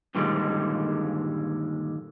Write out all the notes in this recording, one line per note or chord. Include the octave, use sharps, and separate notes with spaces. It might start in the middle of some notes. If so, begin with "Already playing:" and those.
G2 A#2 D3 D#3 G3 G#3